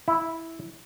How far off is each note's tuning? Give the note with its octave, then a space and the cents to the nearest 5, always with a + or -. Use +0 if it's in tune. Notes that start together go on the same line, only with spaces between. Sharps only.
E4 -5